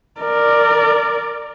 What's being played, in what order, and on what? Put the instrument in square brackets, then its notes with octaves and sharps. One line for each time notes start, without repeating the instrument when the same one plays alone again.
[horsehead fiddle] A#4 D5